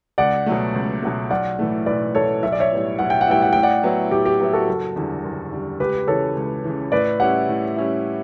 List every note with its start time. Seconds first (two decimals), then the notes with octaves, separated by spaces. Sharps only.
0.18 C#2 D5 F#5
0.46 B2 F#3 A3
0.74 C#2
1.03 B2 F#3 A3
1.30 B1 D5 F#5
1.59 A2 E3 A3
1.86 B1 B4 D5
2.15 A2 E3 A3 A4 C#5
2.43 B1 E5
2.52 D5
2.60 C#5 E5
2.71 A2 G3 B3 E4
2.99 B1 F#5
3.10 G5
3.21 F#5
3.27 A2 G3 B3 E4 G5
3.42 F#5
3.53 A2 G5
3.63 D5 F#5
3.83 F#3 B3 E4
4.11 A2 G4
4.26 G4
4.40 F#3 B3 E4
4.53 F#4 A4
4.68 F#1
4.96 E2 D3 G3
5.24 F#1
5.52 E2 D3 G3
5.80 C#2 G4 B4
6.07 C#3 E3 A4 C#5
6.36 C#2
6.64 C#3 E3
6.92 A2 B4 D5
7.20 G3 C#4 E4 D5 F#5
7.49 A2
7.76 G3 C#4 E4